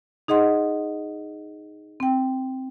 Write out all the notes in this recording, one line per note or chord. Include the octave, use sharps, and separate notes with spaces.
D#4 G#4 D#5 F#5 C6
C4 G5